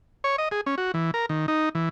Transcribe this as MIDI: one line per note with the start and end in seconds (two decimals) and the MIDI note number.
0.24 0.36 73
0.38 0.49 75
0.51 0.61 68
0.66 0.75 61
0.78 0.92 66
0.94 1.11 52
1.14 1.26 70
1.29 1.46 51
1.48 1.69 63
1.75 1.89 52